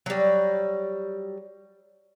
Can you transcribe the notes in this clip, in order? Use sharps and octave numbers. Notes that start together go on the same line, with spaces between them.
F#3 G3